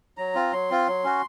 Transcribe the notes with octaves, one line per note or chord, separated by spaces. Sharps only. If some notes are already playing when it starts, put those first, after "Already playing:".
F#3 A#5
C4 F4
F#3 C6
C4 F4
F#3
C#4 F#4